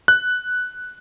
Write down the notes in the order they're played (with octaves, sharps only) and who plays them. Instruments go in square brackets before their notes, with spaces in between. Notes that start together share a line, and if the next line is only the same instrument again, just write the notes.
[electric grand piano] F#6